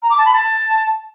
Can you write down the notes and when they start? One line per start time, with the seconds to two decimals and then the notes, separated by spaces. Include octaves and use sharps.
0.02 A#5
0.09 D6
0.17 A5
0.25 B5
0.32 A5